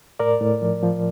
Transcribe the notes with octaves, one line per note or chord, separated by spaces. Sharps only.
A2 A#4 D5
A2
F3
F3